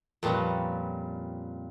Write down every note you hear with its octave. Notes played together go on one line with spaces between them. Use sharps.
F2 A#2 G3 C#4 B4